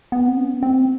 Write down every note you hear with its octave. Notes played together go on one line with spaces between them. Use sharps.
B3
C4
C#4
B3
C4